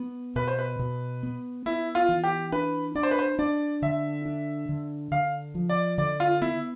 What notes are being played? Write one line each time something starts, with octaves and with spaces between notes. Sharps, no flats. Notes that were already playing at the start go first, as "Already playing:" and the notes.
Already playing: B3
B2 B4
C5
B4
B2
B3
B3 E4
F4
E3
G4
D4 B4
D4 D5
C5
B4
C5
D4 D5
D3 E5
D4
D3
D3 F5
F3
D5
D3 D5
F4
B3 E4